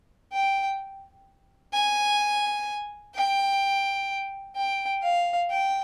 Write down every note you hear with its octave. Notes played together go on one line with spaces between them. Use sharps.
G5
G#5
G5
G5
F5
G5